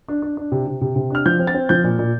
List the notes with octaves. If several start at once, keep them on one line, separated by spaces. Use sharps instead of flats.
D4
D4
D4
C3
C3
C3
C3
D4 F6
F3 G6
C4
A6
C4
F3 G6
A#2
A#2